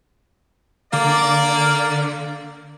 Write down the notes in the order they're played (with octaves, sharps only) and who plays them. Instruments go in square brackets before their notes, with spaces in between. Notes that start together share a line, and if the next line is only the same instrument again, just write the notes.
[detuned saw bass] D3 [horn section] A#3 D5